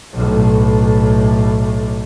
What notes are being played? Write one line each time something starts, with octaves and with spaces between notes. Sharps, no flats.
B1 A2